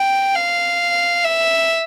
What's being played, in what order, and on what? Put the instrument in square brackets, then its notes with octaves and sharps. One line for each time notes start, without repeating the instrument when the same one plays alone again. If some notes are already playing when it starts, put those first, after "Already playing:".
Already playing: [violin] G5
F5
E5